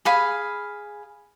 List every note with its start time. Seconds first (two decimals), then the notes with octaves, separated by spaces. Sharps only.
0.05 G#4 F5 B5